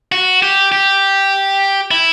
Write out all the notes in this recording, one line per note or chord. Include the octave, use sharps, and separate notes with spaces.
F#4
G4
G4
E4